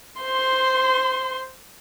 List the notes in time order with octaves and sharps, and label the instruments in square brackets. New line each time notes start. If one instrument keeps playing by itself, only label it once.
[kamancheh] C5 C6